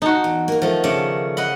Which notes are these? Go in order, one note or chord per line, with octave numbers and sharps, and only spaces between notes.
D#4 F#4 A5
E2
A#3 F4
D#3 F3 A3
C#3 A3 D5
D#5 F#5 B5